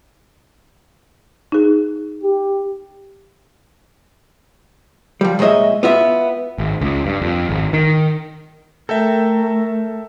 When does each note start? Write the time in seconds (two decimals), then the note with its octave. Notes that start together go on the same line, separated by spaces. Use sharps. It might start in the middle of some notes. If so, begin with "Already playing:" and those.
1.52 D#4 G#4
2.23 G4
5.21 F3 G3
5.39 A#2 G#3 C#5 D#5 E5
5.83 B3 F4 E5
6.58 G#1
6.81 C#2
7.06 G2
7.22 F2
7.49 G#1
7.73 D#3
8.89 A3 A4 A#4 E5 G5